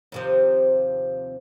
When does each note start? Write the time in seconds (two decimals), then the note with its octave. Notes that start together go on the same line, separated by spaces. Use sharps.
0.12 D#2 C3 F3